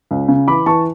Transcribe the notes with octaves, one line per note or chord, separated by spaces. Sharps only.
C#2
C#3
E3 B5 D6
E3 A5 C#6